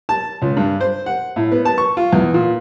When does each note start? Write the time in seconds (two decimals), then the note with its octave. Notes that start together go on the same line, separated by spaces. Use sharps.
0.09 A5
0.42 C#2
0.57 G2
0.80 C5
1.06 F#5
1.36 A2
1.52 B3
1.65 A5
1.78 C#6
1.97 F4
2.13 E2
2.34 A#2